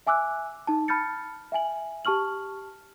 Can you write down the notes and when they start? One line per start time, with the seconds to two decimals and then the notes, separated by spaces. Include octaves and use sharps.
0.07 E5 G#5 D6 E6 F#6
0.67 D#4 A5
0.88 A5 B5 F6 G6 A6 C#7
1.52 E5 G5 G#5 F#7
2.05 G4 A5 C#6 F6 F#7